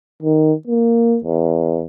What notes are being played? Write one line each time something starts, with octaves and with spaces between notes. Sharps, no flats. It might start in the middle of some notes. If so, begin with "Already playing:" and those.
D#3
A#3
E2